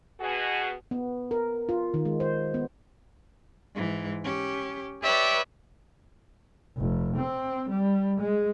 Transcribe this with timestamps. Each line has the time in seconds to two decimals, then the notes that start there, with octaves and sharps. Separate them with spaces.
0.21 B2 F#4 G#4
0.91 B3
1.31 A#4
1.69 F4
1.94 D#3
2.05 G#3
2.20 C5
2.54 B3
3.75 G#2 E3
4.24 C#4 G4
5.02 G4 B4 C#5 D5 E5
6.78 F1
7.16 C4
7.69 G3
8.20 G#3